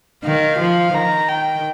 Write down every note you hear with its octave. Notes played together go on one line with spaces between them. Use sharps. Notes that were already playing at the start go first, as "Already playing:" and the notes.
D#3 F5
F3
D#3 A#5
G5